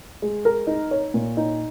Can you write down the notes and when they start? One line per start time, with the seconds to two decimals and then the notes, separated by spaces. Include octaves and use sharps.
0.22 G#3
0.45 A#4
0.67 D#4
0.91 C#5
1.14 A#2
1.37 D#4